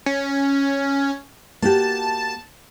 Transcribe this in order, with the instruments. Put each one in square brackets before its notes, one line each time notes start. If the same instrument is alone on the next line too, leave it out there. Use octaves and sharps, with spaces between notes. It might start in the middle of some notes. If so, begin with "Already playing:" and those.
[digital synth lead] C#4
[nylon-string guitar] A#3 F#4 G4 [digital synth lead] A5